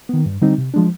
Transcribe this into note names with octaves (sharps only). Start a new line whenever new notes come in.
D#3 B3
G2
D3 G3 C4 D#4
C3
F3 G#3 D4